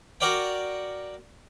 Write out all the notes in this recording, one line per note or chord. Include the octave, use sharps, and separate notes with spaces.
F#4 A#4 D5 F5 G5